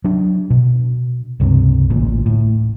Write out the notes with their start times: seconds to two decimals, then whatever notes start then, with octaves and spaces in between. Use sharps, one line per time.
0.04 F#3 D4
0.50 B2
1.40 C#2 G2 C3
1.90 A1 D2 A#2
2.26 A2